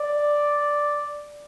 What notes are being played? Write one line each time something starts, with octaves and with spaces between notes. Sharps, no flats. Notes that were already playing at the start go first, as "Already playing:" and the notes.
Already playing: D5